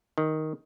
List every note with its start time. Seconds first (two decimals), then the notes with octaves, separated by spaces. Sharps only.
0.18 D#3